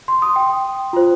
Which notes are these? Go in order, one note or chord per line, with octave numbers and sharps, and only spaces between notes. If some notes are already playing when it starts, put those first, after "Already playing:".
C6
D#6
G5
F4 C5